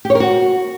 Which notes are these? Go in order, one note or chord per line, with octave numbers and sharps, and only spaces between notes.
G4
C#5
A#4
F#4